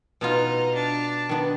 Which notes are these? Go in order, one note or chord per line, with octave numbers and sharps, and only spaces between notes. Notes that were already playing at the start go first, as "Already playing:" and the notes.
B2 B3 D#4 F4
D4
D#3 B3 D4